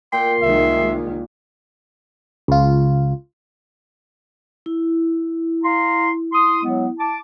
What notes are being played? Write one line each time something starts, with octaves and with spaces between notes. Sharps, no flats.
A#2 G5 C6
C2 D#3 G#3 E5
C#2 F4
E4
F5 A#5 C6
C6 D#6
F#3 G#3 B3
A5 D6